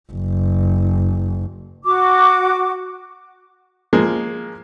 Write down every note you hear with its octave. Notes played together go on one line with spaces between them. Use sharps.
F#1
F#4 D6
F3 G#3 A#3